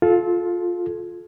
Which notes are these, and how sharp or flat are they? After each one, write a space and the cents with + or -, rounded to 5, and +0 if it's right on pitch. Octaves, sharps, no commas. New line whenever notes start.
F4 +10 A4 -25